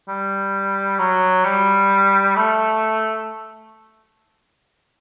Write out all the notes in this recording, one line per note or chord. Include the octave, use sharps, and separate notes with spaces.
G3
F#3
G3
A3